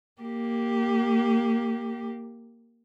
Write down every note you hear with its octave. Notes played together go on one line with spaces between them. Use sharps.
A#3 G4